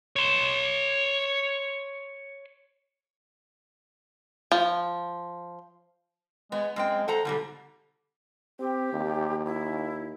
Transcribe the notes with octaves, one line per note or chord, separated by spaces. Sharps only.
C#5 C6
F3
G#3 B3
F#2 G#3 C4 G5
A4 C5 F#5 A#5
G#2 B2 D3 G3
C4 G4
D#2
E4